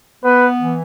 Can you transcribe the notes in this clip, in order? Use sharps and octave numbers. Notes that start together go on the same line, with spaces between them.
B3 B4
E3